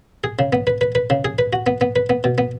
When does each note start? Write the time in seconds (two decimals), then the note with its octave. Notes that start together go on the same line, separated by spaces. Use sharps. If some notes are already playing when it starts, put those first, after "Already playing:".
0.24 G#4
0.39 C#3
0.53 B3
0.67 B4
0.81 B4
0.95 B4
1.10 C#3
1.25 G#4
1.39 B4
1.53 F#4
1.67 B3
1.81 B3
1.96 B4
2.10 B3
2.24 B2
2.38 B3